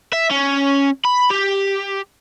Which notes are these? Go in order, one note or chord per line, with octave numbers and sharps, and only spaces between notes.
E5
C#4
B5
G4